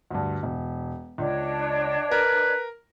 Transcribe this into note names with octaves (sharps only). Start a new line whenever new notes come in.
D2 G2
E1
C#2 D4 C#5 D#5
A#4 B4